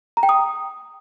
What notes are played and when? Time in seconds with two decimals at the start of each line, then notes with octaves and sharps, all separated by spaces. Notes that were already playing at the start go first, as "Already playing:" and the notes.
0.17 A#5
0.23 G5
0.29 D#6